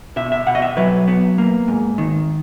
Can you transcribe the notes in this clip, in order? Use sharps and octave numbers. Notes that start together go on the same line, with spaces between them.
B2 E5
E5
B2 F#5
D#5
E5
F#3 B4
B3
A#3
G#2
D#3